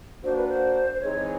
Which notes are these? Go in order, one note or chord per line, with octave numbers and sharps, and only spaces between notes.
A#3 D4 F#4 C5
B4
C5
C5
E3 G#3 C4 D#4 G#4 C#5